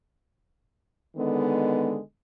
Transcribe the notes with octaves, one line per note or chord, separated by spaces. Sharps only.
D3 D#3 G#3 B3